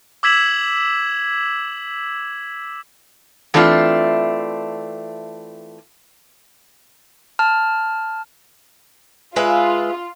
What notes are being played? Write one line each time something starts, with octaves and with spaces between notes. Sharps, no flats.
D6 E6 G#6 B6 E7 F#7
E3 A3 C4 D4 F4
A5 F6
G#3 F4 B4 E5